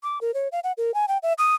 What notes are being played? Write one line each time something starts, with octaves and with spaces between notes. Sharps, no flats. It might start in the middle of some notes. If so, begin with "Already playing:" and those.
D6
A#4
C#5
F5
F#5
A#4
G#5
G5
E5
D#6